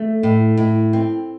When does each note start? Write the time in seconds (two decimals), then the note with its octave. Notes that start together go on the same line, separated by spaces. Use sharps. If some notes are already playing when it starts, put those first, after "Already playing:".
Already playing: A3
0.23 A2
0.57 A2
0.93 C4